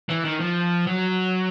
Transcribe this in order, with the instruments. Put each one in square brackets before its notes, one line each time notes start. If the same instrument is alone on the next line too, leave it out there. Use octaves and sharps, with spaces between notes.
[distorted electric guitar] E3
D#3
F3
F#3